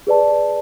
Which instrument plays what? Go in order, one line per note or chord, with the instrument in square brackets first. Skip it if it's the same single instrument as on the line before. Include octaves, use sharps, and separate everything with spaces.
[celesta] G#4 B4 D5 A5